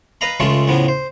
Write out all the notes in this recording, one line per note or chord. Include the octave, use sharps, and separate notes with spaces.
B4 D#5 F5 A#5 B5
C#2 C#3 G#3 A3 F4 A4
A2 C#3 F3 B3
C5